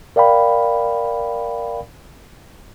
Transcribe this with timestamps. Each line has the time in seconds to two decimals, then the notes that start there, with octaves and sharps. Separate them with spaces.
0.16 A#4 D5 F5 G5 B5